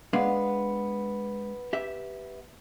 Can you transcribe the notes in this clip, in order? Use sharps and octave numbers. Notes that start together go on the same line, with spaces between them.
G#3 B3 D4 F5
G4 E5